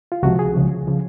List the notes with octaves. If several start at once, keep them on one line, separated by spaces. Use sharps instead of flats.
F4
C#2 C3 F3 F#4
G#4
C#2 C#3 F3
C#3 F3